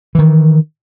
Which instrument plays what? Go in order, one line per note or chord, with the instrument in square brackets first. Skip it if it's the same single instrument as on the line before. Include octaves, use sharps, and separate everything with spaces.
[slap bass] D#3 E3